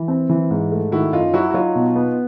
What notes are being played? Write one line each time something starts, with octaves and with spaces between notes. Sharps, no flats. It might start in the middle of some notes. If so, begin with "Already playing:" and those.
Already playing: E3
C4
E3
G#2
A3
D#3 E4 F#4
F#2 D#4 F4
F#3 E4 F#4
F#4
F#3 D#4 F4
B2
B3